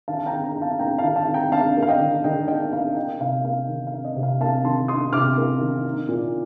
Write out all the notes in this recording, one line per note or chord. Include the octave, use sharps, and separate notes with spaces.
D#3 F5 A5
A5
G5 A#5
D#3
G5 A#5
D4
F5 A5
A#3 G5 A#5
F5 A5
D#3
F5 A5
D#3
G5 A#5
D4 F5 A5
A#3
F5
D#5 G5
D#3
D#3 D#5 G5
D4 D#5 G5
A#3 F5
D#4 D#5 G5
C3 F5
A#3 F5
D#3
F5
D#4
D#5
C3
F5
A#3 F5 A5
D#3 A5 C6
D#4 C6 D#6
C3 D6 F6
A#3
D#3
D#4
A#2